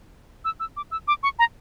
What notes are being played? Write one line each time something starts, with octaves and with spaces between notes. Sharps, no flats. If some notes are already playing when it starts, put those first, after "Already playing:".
E6
E6
D6
E6
D6
C#6
A#5